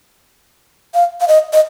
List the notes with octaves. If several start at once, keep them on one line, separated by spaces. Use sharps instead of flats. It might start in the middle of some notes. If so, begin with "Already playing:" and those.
F5
F5
D#5
D#5